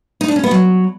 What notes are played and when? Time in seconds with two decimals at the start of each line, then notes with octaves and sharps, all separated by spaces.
0.21 D#4
0.28 D4
0.36 C#4
0.44 B3
0.51 F#3